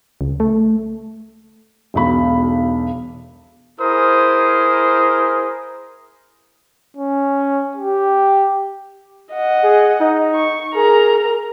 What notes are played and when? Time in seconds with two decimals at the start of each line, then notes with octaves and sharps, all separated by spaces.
0.21 C#2
0.40 A3
1.94 E1 B1 B5
3.80 E4 G#4 A#4 C5 D#6
6.97 C#4
7.77 G4
9.32 D#5 F#5
9.63 G#4
10.00 D#4
10.35 C#6
10.75 G#4 A#4 A#5